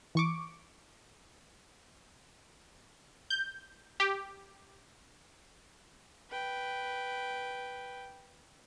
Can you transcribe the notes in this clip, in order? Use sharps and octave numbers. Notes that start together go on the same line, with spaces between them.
E3 C#6 D6
G6
G4
B4 G5